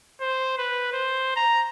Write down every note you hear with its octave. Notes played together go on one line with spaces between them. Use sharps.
C5
B4
C5
A#5